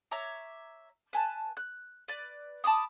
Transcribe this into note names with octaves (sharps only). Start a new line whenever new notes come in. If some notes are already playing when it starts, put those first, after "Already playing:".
C#5 E5 A#5 D6
B4 G#5 A5
F#6
B4 D5
A5 B5 D6 D#6